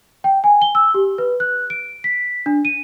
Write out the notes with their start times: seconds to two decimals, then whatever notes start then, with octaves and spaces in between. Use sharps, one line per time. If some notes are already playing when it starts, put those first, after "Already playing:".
0.24 G5
0.44 G#5
0.62 G7
0.75 E6
0.94 G4
1.18 B4
1.40 F#6
1.70 D7
2.04 B6
2.46 D4
2.65 D#7